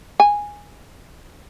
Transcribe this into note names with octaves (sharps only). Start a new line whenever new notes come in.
G#5